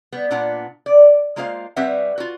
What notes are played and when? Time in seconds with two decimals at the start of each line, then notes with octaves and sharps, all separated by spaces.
0.12 G3 B3
0.31 A#2 B3 D4 F4 F#5
0.86 D5
1.36 G#3 A#3 F4 C5 D5 F5
1.76 G3 C4 B4 C#5 E5 F#5
2.18 F4 F#4